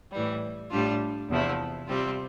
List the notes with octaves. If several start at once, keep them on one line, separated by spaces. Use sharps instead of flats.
A2 E3 G3
A2 G3 D4 F4
E2 C3 F3 A3 E4
C3 G3 C4 F4